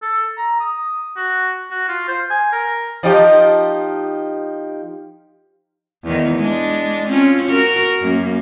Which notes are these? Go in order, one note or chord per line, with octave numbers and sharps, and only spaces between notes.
A4
A#5
D#6
F#4
F#4
F4
C5
G#5
A#4
F3 D#4 G4
E2 D#3
G#3 D4
C4 C#4 F4
F#4 A#4
F#2 A#3